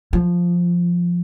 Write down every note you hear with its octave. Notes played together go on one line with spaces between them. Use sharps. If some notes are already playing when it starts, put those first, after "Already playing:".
F3